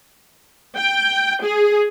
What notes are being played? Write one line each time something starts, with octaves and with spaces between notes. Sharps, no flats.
G5
G#4